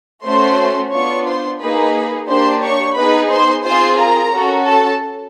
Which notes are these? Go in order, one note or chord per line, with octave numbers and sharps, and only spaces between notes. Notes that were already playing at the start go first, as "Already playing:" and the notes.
A3 C#4 F#4 C5 C6
B3 D4 F4 C#5 C#6
C5 C6
A#3 D#4 G#4 B4 B5
A#3 D4 G4 C5 C6
C#5 C#6
B3 D#4 G#4 B4 B5
C5 C6
C4 F4 G#4 C5 C6
A#4 A#5
C#4 F#4 A4
A4 A5